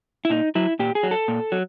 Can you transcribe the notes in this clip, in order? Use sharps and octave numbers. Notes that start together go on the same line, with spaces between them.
E4
A#2 D#4
F#3 E4
A#2 G4
G#4
F#3
A4
A#2
F#3